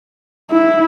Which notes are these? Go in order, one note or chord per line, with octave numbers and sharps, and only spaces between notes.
E4